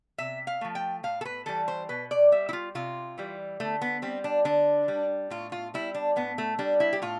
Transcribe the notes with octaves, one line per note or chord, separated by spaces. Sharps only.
C3 E5
F5
F3 A3
G5
A2 F5
A4
B4
E3 G3 A4
C5
B2 B4
D5
G3 E5
E4
F4
C3 F4
E3 G3
D3 A3
B3
G3 C4
D4
D3 D4
G3
A2 F4
F4
G3 E4
D4
A2 B3
A3
G3 D4
E4
G4
A2 F4